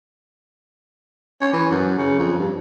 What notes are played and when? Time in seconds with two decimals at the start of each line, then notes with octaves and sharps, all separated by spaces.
1.41 C#4
1.53 E3
1.71 F#2
1.98 C#3
2.19 F2
2.38 G2